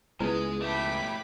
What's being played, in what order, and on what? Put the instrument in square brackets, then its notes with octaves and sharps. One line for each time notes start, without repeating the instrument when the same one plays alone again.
[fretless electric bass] C#2 B3 [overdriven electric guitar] G#3 D#5 [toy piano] E4 B4
[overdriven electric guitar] A3 G4 [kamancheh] B5 D6